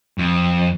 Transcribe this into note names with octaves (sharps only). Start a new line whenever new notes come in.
F2